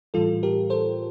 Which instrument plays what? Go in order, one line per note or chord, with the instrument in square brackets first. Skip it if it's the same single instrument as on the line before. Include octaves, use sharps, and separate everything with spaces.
[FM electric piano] A2 E3 G3 F4 A4
G4 A#4
A4 C5